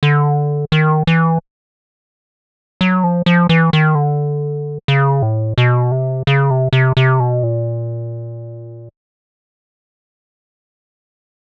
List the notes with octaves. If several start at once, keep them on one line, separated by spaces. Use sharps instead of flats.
D3
D#3
E3
F#3
F3
F3
E3
D#3
D3
C#3
A2
B2
C3
C#3
C3
C3
C3
B2
A#2